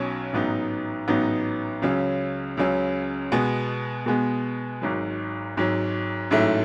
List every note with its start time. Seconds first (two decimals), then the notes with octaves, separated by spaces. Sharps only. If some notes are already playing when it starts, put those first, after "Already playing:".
Already playing: B1 B2 F#3 C#4
0.33 A1 G#2 F#3 B3 D#4
1.08 A1 G#2 F#3 B3 D#4
1.82 C#2 C#3 F#3 C#4
2.57 C#2 C#3 F#3 C#4
3.32 B2 G#3 B3
4.06 B2 G#3 B3
4.82 G#1 G#2 F#3
5.57 G#1 G#2 F#3
6.31 A1 G#2 F#3 A3 E4